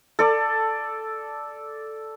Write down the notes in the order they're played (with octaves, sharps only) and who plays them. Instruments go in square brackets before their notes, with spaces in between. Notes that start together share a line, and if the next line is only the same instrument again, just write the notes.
[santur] A4 D5